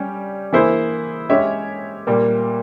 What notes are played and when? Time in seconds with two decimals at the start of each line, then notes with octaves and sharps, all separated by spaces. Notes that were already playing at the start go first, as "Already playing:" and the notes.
Already playing: G3 C#4 G4
0.53 E3 A#3 E4 G#4 C5
1.29 G#3 C#4 G4 C#5 E5
2.07 A#2 G3 A#3